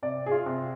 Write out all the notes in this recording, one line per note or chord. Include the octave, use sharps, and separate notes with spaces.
C3 D5
G#4
F4
C3